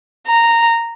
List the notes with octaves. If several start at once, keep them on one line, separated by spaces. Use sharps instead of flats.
A#5